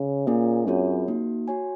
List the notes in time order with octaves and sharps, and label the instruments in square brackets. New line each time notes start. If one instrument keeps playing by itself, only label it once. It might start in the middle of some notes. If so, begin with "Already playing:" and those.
Already playing: [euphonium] C#3
[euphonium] A#2 [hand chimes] A#3 C#4 G#4 C#5 G#5
[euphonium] F#2 [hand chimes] C4 F4 G#4 C#5
[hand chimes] A#3 D#4 F#4
F#4 C#5 G#5